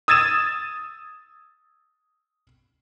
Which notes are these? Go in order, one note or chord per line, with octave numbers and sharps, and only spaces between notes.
D#6 E6 G#6 A6 D#7 E7